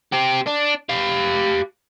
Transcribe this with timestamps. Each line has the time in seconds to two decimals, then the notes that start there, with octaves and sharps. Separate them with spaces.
0.12 C4 G4
0.47 D4
0.89 G4 F5